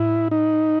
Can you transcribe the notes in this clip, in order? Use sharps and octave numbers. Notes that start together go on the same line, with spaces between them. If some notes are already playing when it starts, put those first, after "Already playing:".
Already playing: A2 E4
D#4